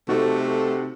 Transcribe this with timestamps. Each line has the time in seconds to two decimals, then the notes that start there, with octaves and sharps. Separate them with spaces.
0.09 C3 A3 D#4 F#4 A4